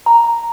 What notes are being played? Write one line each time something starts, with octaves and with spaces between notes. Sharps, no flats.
A#5